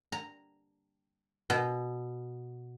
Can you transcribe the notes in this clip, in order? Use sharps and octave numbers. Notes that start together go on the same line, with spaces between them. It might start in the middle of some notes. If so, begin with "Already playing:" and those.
A#5
B2